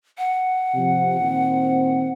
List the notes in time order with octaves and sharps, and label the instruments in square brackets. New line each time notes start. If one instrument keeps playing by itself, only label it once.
[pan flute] F#5
[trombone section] C3 F3
A#2 D#3 C4